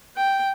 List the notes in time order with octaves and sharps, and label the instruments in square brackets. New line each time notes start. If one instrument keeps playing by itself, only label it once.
[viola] G5